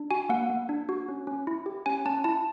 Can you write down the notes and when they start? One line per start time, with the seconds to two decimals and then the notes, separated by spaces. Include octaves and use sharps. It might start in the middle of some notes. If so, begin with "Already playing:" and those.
Already playing: D4
0.11 F#4 G#5
0.29 A#3 F#5
0.50 A#3
0.69 D4
0.89 F#4
1.09 C#4
1.27 C#4
1.47 E4
1.66 G4
1.86 C#4 G#5
2.06 C#4 A5
2.24 E4 A5